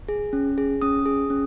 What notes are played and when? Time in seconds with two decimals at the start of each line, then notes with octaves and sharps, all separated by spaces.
0.09 G#4
0.33 C#4
0.58 G#4
0.82 C#4 D#6
1.06 G#4
1.30 C#4